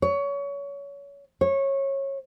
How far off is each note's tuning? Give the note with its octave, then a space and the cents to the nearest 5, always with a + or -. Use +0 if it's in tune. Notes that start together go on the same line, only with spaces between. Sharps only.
C#5 +25
C#5 -20